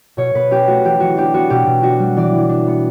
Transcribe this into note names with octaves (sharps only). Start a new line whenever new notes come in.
B2 C#5
B2 B4
C#4 G4
A3 F#4
E3 G4
E3 F#4
D4 G4
B3 F#4
B2 G4
B2
D4 F#4
G3
E3 D5
E3
D4
B3